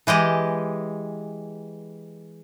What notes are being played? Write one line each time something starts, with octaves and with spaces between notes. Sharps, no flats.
E3 G#3 G4 D#5